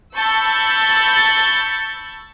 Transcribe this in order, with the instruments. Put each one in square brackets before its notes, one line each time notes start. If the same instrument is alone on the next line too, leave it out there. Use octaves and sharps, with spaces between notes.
[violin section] A5 B5 C#6 E6 G6 A6